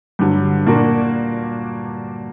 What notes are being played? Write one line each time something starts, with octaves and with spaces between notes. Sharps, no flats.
G2 D3 F#3
A#2 A#3 D4 F#4